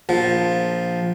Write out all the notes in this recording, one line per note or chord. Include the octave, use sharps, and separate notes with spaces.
A#1 F3